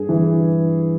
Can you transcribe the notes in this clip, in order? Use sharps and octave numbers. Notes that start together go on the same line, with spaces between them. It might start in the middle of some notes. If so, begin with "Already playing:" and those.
Already playing: G2 G#4
E3